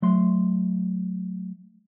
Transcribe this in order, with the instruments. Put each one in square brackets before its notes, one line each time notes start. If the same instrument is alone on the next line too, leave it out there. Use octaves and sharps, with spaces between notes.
[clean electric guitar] F#3 A3 C6